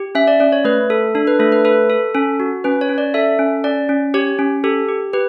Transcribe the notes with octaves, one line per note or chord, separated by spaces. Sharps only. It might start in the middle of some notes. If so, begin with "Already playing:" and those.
Already playing: G4
C#4 E5
D5
C#4 D5
C#5
A3 B4
A4
D4 A4
B4
A3 A4
B4
A4 B4
A4
C#4 A4
F#4
C#4 B4
C#5
C#4
D5
A4 E5
C#4
C#4 D5
C#4
G4 C#5
C#4
G4 A4
G4
G4 B4